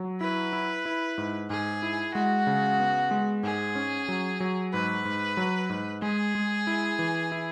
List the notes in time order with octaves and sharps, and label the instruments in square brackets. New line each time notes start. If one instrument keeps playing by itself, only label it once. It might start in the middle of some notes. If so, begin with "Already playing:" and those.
Already playing: [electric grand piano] F#3
[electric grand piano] E4 [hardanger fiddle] B4
[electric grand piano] E4
E4
G#2
[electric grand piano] G#2 [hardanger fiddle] G#4
[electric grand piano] E4
[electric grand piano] G#3 [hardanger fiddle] F#4
[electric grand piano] C#3
B3
G#3
[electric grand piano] G#2 [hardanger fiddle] G#4
[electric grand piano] C#4
F#3
F#3
[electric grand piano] G#2 [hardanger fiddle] B4
[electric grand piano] G#2
F#3
G#2
[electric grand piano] G#3 [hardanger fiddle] G#4
[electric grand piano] G#3
E4
E3
E4